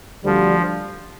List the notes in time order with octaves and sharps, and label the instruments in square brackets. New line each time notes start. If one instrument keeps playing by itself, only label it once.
[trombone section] D2 D3 G3 [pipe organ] F3